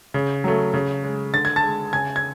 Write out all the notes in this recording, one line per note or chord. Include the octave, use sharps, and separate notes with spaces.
C#3
F#3 A3
C#3
G#3
D3 A6
G#6
A5 A6
G#3
C#3 G#5 G#6
G#6